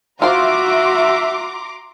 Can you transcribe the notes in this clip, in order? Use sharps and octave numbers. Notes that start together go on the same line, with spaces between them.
F4 F#4 C5 E5 A#5 C6 D6